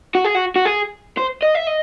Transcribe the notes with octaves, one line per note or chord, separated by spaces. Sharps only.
F#4
G#4
F#4
F#4
G#4
C5
D#5
E5
D#5